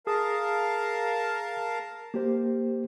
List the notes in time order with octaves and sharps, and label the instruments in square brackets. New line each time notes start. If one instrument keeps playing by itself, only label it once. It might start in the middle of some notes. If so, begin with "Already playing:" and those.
[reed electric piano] G#4 D#6 [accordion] A#4 F5 A5
[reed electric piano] A#3 G4 C5